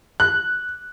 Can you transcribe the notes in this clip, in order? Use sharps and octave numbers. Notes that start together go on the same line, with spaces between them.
F#6